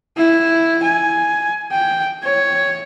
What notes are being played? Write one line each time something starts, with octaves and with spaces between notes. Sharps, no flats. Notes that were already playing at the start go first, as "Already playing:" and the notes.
E4
G#5
G5
C#5